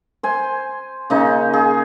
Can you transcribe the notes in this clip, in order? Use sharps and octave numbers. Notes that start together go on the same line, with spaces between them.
C5 G#5
C#3 A#3 D#4
G#4